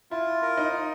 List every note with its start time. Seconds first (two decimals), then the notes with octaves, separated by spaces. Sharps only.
0.11 E4 F4
0.42 A#4
0.57 D#4
0.73 F4